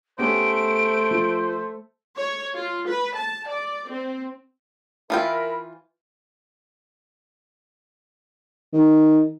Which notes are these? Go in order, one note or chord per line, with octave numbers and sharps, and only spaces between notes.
A3 B3 C#4 G4 C5 D7
F3
C#5
F4
B4
A5
D5
C4
E3 F4 A#4 E5 G5 B5
D#3